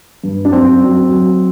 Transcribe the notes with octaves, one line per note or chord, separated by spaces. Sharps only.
G2
D4
F#2 C4
F#3
F#3